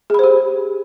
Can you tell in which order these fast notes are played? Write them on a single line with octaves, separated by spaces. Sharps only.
G#4 B5 C5 G4